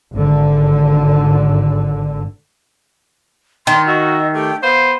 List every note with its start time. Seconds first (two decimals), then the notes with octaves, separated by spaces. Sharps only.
0.11 G#1 D3
3.67 D#3 C6
3.87 F#4 D#5 E5
4.34 A3 G4 G5
4.63 B3 C5 F5